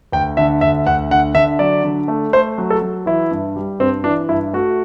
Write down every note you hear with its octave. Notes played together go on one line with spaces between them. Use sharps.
D2 G5
D3 E5
D2 E5
D2 F#5
D3 F#5
D3 E5
F#3 D5
D3
A3
A3 C5
F#3
A4
F#3
E3 E4
G2
G3
G2 C4
E3 D4
G2 E4
A3 F#4